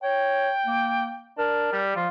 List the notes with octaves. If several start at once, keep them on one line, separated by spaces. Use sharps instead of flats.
C#5 G5
A#3
D4 A#4
G3
F3 F4